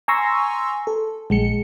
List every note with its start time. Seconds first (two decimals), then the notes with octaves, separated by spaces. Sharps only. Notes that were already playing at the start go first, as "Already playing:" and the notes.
0.08 G#5 A#5 C6 C#6 E6 A#6
0.87 A4
1.30 A#1 G#3 C#7